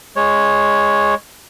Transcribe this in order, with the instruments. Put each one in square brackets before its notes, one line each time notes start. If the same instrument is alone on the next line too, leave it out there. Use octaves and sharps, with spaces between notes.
[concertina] G#3 C#5